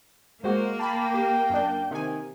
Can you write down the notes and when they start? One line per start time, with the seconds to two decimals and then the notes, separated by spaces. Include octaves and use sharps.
0.44 G#3 A#3 F#4 C5
0.80 G5 A5 B5
1.14 G4
1.50 F#2 D4
1.91 C3 D#3 G#5